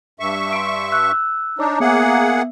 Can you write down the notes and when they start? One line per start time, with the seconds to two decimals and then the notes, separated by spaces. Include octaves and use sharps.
0.20 G2 E5 C#6
0.53 C6 D7
0.92 E6 F#6
1.59 D4 D#4 C#5 D6
1.80 A#3 B3 G#4 E5 F#5